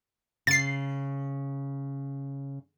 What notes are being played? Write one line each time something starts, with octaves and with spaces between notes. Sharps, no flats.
C#3 A6 C7